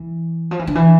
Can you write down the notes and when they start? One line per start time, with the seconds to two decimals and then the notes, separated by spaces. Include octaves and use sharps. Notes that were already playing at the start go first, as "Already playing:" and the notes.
Already playing: E3
0.51 F3
0.59 E3
0.67 D3
0.75 E3